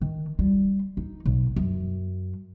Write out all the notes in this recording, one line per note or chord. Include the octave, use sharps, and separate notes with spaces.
D#3
G3 F4
D#4
B1
F#2